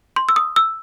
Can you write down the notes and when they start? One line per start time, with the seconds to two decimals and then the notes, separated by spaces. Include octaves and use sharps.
0.16 C6
0.29 E6
0.36 D#6
0.56 E6